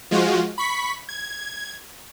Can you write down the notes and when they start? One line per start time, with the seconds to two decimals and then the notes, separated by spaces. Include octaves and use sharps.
0.11 F3 G#3 F4 F#4
0.58 B5 C#6 B6
1.09 G#6